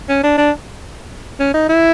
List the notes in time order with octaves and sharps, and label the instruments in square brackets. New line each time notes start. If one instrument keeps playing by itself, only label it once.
[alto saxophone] C#4
D4
D4
C#4
D#4
E4